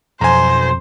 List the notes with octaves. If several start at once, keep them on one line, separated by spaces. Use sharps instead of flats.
B1 F2 C5 G#5 A#5